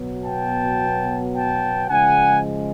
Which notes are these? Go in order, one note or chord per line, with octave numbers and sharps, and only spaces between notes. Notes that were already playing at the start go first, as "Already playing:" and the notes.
Already playing: B2 F#3 B3
G5 A5
G5 A5
C#3 F3 G#3 F#5 G#5